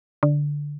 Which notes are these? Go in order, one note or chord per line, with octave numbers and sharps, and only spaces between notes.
D3